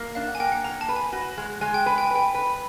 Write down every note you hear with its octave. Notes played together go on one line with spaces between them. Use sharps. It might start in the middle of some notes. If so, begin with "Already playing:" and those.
Already playing: A#3
D4 F5
F#5
G#5
A#3 G5
F#5
A#3 A#5
A5
B4
G#5
F#4
G#3
G#3 G#5
G5
B4 G#5
G5
G#5
B4 G5
B4